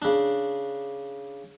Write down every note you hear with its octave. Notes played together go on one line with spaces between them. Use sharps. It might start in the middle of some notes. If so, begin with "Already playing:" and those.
C#3 D4